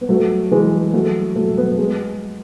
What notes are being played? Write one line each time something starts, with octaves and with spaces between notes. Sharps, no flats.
B3
F#3 A3
E3 G#3
F#3 A3
F#3 A3
B3
G#3 B3